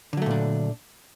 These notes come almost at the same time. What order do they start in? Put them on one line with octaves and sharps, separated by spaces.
D3 F#3 A3 A#2 D4